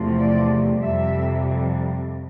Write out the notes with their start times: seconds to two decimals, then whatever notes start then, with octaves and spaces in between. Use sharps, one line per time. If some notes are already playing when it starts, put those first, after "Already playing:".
Already playing: E2 C3 F3 A3
0.18 D5
0.81 F2 C3 G3 E5